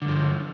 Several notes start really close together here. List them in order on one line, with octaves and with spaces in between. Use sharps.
D3 G2 F3